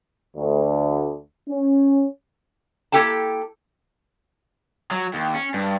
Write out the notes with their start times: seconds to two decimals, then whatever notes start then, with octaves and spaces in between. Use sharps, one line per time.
0.37 D2
1.48 C#4
2.92 A#3 E4 G4 A4 G5 A5
4.91 F#3
5.14 D#2
5.34 C#4
5.54 G2